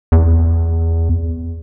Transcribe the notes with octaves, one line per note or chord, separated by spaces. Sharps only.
E2